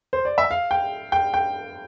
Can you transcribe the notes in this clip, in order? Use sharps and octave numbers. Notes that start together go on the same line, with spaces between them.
C5
D5
E5
F5
G5
G5
G5